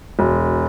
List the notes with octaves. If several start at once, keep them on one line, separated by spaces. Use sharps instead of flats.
E1